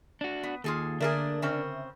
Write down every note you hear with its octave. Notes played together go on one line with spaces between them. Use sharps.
D4 F#4
B3
D#2 F4 G#4 A4
D3 A3 A#3 D4 G#4 A#4 E5
C#3 C4 C#4